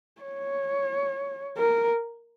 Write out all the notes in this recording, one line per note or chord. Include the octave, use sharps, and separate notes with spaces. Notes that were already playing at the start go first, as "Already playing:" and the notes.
C#5
A#4